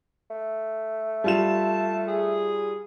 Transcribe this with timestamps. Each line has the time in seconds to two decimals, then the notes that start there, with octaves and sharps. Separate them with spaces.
0.30 A3
1.24 G3 F4 A5 E7
2.08 G#4